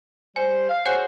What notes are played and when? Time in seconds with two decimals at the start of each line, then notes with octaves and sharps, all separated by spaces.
0.36 G3 C5 G#5
0.69 F5
0.85 F#4 G#4 C5 C#5 F#5 G#5